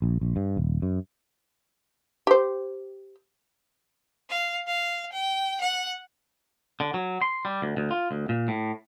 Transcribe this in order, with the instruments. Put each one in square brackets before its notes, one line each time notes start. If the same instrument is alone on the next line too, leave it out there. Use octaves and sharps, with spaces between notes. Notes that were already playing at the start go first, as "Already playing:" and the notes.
[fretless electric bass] A#1
A#1
G2
D#1
F#2
[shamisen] G4 C5
[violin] F5
F5
G5
F#5
[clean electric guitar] D3
F#3
C6
G3
D2
D2
F4
D2
A#2
A2